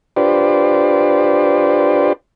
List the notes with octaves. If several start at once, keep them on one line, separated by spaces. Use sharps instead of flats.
D4 F4 G4 B4 C5 D5